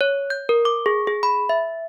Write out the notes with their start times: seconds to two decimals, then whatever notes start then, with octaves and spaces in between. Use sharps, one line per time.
0.01 C#5
0.30 G6
0.49 A#4
0.65 D6
0.86 G#4
1.07 G#4
1.23 B5
1.49 E5